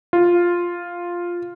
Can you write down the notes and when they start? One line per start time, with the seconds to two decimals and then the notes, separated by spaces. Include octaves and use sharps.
0.13 F4